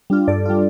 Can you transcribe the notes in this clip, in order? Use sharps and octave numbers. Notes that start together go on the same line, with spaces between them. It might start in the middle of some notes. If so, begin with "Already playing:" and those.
G3 D4 F4
G2 A4 D5
G3 D4 F4